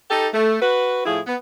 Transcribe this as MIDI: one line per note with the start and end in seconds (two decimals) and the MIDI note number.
0.10 0.27 63
0.10 0.27 67
0.10 0.27 69
0.33 0.61 57
0.61 1.03 66
0.61 1.03 71
1.05 1.20 45
1.05 1.20 53
1.05 1.20 64
1.05 1.20 68
1.27 1.36 59